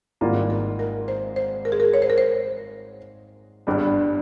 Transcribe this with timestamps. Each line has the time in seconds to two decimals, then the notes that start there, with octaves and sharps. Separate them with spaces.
0.21 G#1 G#2 G3 A#3 F4
0.50 A#4
0.79 A#4
1.08 C5
1.36 C5
1.65 A#4
1.72 G#4
1.80 A#4
1.94 C#5
2.02 C5
2.10 A#4
2.18 C5
3.67 G1 G2 G3